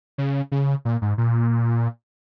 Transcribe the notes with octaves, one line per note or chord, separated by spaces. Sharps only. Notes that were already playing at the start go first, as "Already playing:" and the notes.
C#3
C#3
A#2
G#2
A#2